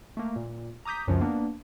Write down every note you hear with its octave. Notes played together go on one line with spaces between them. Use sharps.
A3 A#3
A#2
A#5 D6 D#6 G6 B6
C#2 F#2 C#3 F3
A#3 B3 D4